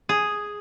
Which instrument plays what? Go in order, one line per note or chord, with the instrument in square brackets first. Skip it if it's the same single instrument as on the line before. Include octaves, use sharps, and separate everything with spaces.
[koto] G#4